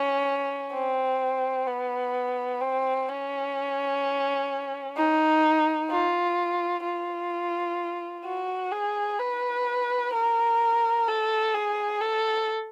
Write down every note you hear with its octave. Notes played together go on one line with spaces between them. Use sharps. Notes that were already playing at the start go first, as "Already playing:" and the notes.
Already playing: C#4
C4
B3
C4
C#4
D#4
F4
F4
F#4
G#4
B4
A#4
A4
G#4
A4